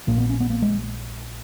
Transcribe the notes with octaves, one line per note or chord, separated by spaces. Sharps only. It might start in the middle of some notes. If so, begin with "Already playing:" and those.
A#1 A#2 A#3
B3
C#4
B3
A#3
G#3